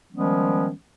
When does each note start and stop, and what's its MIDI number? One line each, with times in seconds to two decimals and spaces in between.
0.13 0.71 51
0.13 0.71 53
0.13 0.71 55
0.13 0.71 56
0.13 0.71 59
0.13 0.71 61